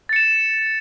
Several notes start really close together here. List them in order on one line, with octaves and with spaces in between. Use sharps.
A6 C#7 E7